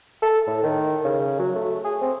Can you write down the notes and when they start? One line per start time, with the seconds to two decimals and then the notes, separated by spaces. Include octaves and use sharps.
0.22 A4
0.47 A2
0.63 D#3
1.05 C#3
1.39 F#3
1.55 A3
1.84 G#4
2.01 C4